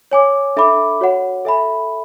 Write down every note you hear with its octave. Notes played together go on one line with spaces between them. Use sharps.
C#5 G#5 D6
D4 A4 E5 B5 D6
F#4 C#5 F#5
A4 E5 G#5 B5